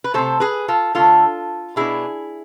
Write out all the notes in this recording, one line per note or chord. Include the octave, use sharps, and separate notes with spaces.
B4
C3 E3 A3 A4 C5
G#4 B4
F4 A4
D3 A3 C4 F4 A4
B2 B3 D4 E4 G#4